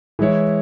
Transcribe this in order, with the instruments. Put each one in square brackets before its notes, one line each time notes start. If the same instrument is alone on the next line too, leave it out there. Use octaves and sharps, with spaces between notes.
[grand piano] E3 G#3 E4 C#5